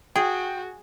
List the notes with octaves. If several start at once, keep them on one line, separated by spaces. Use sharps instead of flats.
F#4 G#4 G5